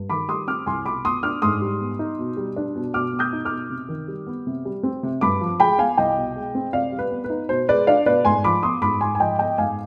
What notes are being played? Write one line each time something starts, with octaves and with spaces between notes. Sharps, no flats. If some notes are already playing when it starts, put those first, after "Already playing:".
Already playing: G2
D#3 B5 D6
G3 C6 D#6
C4 D6 F6
C2 G#5 C6
B2 B5 D6
B3 C6 D#6
D4 D6 F6
G#2 C6 D#6
G3
B3
D#4
B2
G3
D4
B2
B2 D6 F6
B3
D#6 G6
D#4
D6 F6
B2
C3
D#3
G3
B3
C3
G3
C4
C3
G2 B5 D6
F3
G#3 G5 B5
B3 F5 G#5
C2 D#5 G5
B2
G#3
C4
C3 D5 F5
G3
B4
B3
B4
D#4
B2 C5
G#3 B4 D5
D4 D5 F5
B2 B4 D5
G#2 G#5 C6
F3 B5 D6
B3 C6 D#6
G#2 B5 D6
G#2 G#5 C6
G#5
F3 D#5 G5
B3 D#5 G5
G#2 F5 G#5